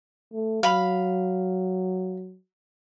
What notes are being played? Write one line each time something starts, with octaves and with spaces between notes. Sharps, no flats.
A3
F#3 F5 B5